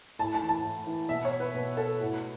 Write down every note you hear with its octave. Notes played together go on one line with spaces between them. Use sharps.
A2 A5
A5
E3
A5
A2
E3
B2 E5
C#5
B4
B2 B4
A4
A2 F#4